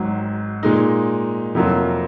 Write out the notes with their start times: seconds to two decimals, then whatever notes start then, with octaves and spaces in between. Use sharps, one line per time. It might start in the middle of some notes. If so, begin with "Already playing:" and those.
Already playing: G#1 G#2 F#3
0.63 A#2 G#3 D#4
1.55 F2 C3 F#3 A#3 F4